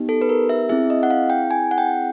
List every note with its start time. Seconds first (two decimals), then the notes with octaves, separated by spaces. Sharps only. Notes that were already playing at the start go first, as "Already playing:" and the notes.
Already playing: B3 D#4 G4
0.09 A4
0.21 B4
0.29 A#4
0.49 E5
0.69 C4 E4 G#4 E5
0.90 D#5
1.03 F#5
1.10 F5
1.30 G5
1.51 G#5
1.71 F#5
1.78 G5